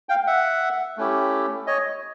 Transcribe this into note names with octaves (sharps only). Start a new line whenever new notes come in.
F5 G5
E5 F#5
A3 C#4 E4 G4
C#5 D#5